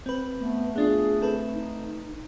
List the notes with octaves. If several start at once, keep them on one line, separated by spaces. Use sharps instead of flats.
C4 B4
A3 B3
B3 D4 F4 G#4
C4 A4 B4
D#4